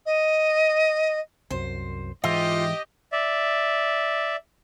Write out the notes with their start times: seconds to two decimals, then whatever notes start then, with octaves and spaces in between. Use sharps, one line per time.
0.06 D#5
1.51 C2 F#2 C5
2.24 G#2 E3 F4 G4 D#5 E5
3.12 D5 E5